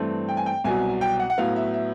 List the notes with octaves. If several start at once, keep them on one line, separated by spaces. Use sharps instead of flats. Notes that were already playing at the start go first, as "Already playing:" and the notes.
Already playing: G2 E3 A3 C4
G5
G#5
G5
C2 B2 F#3 G#5
G5
F#5
F#5
A2 F#3 B3 F5
E5
E5